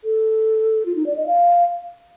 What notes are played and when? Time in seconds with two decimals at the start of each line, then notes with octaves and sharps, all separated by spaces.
0.04 A4
0.86 F4
0.96 D#4
1.06 D5
1.16 D#5
1.27 F5